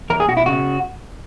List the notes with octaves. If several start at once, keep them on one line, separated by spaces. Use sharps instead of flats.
E2 A#4
G#4
B2 F#4
E4
C#3 F#4